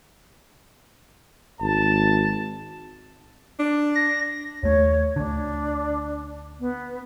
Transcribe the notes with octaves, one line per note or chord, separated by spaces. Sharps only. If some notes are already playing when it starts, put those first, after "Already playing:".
G#1 A5
D4
A#6
D#2 A3 C#5
D2 D3 D4
B3